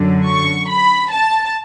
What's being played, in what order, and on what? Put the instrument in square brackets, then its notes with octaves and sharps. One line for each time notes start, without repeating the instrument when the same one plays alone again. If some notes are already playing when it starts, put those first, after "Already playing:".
Already playing: [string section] F#2 D3 F#3
C#6
B5
A5